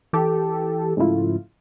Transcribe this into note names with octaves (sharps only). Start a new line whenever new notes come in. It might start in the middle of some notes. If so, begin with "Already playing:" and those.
E3 G4 A4
G#2 C#3 F3 A3 E4 F4